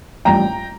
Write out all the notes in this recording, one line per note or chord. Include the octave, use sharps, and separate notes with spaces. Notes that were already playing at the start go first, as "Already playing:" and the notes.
A1 G2 F3 G5 A#5